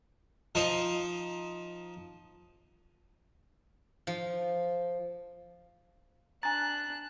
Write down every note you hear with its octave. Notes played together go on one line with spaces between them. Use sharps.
F3 D#4 C5
F3
D4 G#5 A#5 F#6 A6